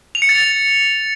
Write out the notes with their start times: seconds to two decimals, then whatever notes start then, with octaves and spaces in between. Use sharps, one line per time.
0.15 F7
0.22 C#7
0.29 A6